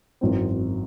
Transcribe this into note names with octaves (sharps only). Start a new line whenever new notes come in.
G#1 F#2 E3 C4